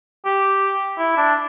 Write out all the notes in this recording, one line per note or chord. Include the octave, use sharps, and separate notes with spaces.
G4
E4
D4